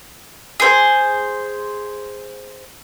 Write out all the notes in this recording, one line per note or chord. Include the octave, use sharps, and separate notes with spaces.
G#4 C5